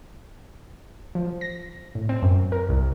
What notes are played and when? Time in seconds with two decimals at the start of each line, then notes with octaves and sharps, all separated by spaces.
1.15 F3
1.41 A#6
1.95 A2
2.09 C4
2.23 F#2
2.52 A#4
2.69 C2